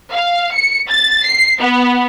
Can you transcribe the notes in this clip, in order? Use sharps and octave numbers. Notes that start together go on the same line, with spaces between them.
F5
C#7
A6
C7
B3